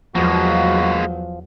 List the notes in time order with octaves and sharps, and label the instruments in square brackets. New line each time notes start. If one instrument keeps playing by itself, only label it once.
[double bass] E2 F#3 [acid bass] F3 [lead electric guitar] G#3 A#3 [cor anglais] F#4